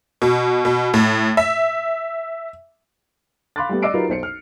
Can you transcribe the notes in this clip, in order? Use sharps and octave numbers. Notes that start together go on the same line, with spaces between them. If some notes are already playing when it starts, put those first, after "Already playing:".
B2
B2
A2
E5
F5 B5 C6 D6 F#6 A6
G3 A3 B3 G4
D5 D#5 D6 E6 C7 D7
F#3 D#4 F4 G4 A#4 B4
B1 C5 C7 C#7
F6